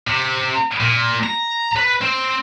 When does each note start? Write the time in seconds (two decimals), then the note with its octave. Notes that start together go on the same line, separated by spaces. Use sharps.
0.07 C3
0.81 A#2
1.24 A#5
1.77 B4
2.02 C4